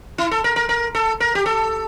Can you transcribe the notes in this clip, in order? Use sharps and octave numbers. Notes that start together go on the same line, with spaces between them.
E4
A4
A#4
A#4
A#4
A4
A#4
G4
A4